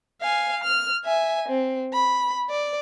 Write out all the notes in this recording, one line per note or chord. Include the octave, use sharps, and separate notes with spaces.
F5 G#5
F6
E5 G#5
C4
B5
D5